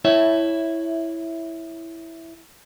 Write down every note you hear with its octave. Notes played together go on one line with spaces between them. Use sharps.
E4 C#5 E5